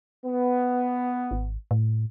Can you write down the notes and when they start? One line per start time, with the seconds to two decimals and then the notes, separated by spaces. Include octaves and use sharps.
0.26 B3
1.31 G#1
1.71 A2